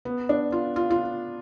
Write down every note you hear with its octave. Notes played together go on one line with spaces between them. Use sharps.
B3
D4
F4
F4
F4